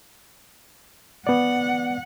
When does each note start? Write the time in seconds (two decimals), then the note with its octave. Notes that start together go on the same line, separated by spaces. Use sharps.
1.27 B3 D5 F#5